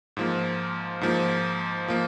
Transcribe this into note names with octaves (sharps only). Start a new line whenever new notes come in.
G#2 F3 A#3
G#2 F3 A#3
F3 A#3